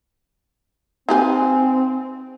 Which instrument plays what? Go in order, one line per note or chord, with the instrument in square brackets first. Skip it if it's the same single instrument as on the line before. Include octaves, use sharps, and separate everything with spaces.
[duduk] C4 [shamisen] D#4 G4 B4 [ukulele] F5 G#5